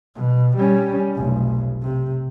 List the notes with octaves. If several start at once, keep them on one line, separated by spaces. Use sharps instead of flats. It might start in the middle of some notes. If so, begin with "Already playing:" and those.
B2
G3 C#4
F1 B1
C3